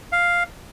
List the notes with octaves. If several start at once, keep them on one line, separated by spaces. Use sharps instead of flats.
F5